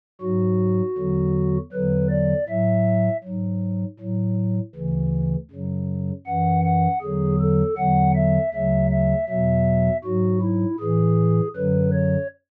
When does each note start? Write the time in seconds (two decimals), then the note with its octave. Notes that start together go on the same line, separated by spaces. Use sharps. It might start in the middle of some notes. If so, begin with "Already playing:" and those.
0.21 G#2 F#3 F#4
0.98 E2 D3 F#3
1.73 E2 D3 F#3 B4
2.10 D5
2.49 A2 F#3 E5
3.24 G#2 F#3
4.00 A2 F#3
4.76 D2 C#3 E3
5.51 F#2 C#3 F#3
6.27 F#2 E3 F#5
6.65 F#5
7.02 E2 D3 F#3 G#4
7.40 A4
7.77 E2 D3 F#3 F#5
8.15 E5
8.53 D2 C#3 F#3 E5
8.91 E5
9.29 E2 B2 F#3 E5
10.04 G#2 F#3 F#4
10.42 E4
10.80 A2 E3 G#4
11.56 F#2 D3 F#3 B4
11.93 C#5